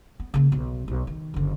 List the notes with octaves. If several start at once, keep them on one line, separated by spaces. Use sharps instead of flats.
B3
C#3 A#3
B1
B1
D#3
F#1 D3